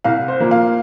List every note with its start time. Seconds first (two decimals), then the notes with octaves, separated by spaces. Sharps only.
0.04 C2 F5
0.28 C5
0.40 A#2 F3 A#3
0.51 F5